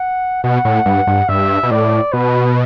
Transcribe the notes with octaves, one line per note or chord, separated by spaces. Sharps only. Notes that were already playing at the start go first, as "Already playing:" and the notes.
Already playing: F#5
B2 F#5
A2
G2
G2
G2 E5
B2
A2 D5
B2 B4